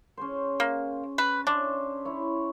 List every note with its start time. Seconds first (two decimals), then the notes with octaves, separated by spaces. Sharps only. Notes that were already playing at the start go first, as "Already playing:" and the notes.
0.17 C#4 G#4 C5
0.60 A#3
1.18 B4
1.47 C#4 D4 C5 E5
2.05 E4 C#5